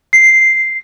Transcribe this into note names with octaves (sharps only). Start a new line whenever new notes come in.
C7